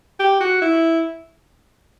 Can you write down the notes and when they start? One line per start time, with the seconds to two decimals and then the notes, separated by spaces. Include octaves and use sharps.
0.20 G4
0.40 F#4
0.62 E4